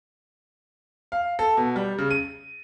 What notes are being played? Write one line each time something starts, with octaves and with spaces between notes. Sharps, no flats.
F5
A4
B2
G3
C#3
D#7